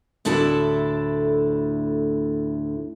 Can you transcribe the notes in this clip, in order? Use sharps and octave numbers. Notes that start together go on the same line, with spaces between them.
D2 A2 D4 E4 A4 A5